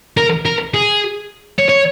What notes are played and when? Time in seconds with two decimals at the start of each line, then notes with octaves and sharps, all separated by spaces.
0.17 A#4
0.45 A#4
0.74 G#4
1.59 C#5
1.69 C#5